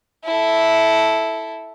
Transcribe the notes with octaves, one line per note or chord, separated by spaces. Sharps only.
E4 A4